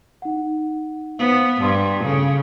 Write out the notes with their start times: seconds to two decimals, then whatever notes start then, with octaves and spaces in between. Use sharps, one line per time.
0.22 D#4 F#5
1.19 B3 C5 F5
1.61 G2 A5 C6
2.04 C#3 A4 F5